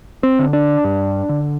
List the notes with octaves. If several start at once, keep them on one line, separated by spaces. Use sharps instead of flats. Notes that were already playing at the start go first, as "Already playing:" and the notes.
C4
D3
D4
G2
D3